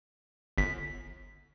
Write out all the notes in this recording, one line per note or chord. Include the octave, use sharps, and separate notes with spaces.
G1 B6